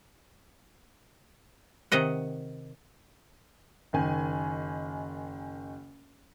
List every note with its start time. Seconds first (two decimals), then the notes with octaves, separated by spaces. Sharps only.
1.92 C3 D#3 D#5 F#5
3.93 F#1 D#3 G#5